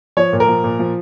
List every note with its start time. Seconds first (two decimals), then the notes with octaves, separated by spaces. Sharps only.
0.17 F3 C#5
0.33 A#2
0.40 A#4
0.48 F3
0.64 A#2
0.79 F3